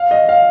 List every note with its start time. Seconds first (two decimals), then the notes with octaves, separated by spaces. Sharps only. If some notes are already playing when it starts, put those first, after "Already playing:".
Already playing: F5
0.11 D#5
0.29 F5